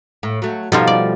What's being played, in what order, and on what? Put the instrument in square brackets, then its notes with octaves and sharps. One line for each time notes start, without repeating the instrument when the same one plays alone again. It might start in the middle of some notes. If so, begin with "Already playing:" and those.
[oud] A2
F#3 A3
[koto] B2 D#4 F4 [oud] F3 G3 A3
[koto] D5